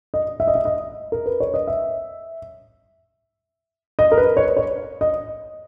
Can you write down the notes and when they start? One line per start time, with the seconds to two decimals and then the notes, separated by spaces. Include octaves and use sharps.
0.14 D#5
0.40 E5
0.47 D#5
0.55 E5
0.65 D#5
1.12 A#4
1.26 B4
1.40 C#5
1.54 D#5
1.67 E5
3.99 D#5
4.12 A#4
4.17 B4
4.37 C#5
4.57 C#5
5.01 D#5